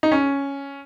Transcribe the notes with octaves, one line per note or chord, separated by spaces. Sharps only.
D#4
C#4